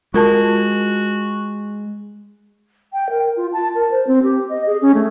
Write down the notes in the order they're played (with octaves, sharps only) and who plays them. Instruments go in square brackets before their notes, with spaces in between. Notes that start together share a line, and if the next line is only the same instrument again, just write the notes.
[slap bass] G#3 [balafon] F4 A#4 A5 [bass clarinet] F#4
[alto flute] G5
A#4
F4
A5
A#4
C5
C4
G4
D#5
G#4
C#4
A3